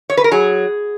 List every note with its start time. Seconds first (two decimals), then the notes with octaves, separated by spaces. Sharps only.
0.10 C#5
0.17 B4
0.24 A#4
0.31 F#3 G#4